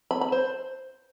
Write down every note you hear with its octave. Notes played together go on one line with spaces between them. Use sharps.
B5
B5
C5